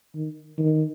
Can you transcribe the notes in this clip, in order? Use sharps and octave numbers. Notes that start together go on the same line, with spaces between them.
D#3
D#3